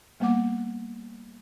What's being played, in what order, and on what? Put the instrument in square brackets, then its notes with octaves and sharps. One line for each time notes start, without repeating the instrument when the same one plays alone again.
[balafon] G3 A#3 B3 F#5 D6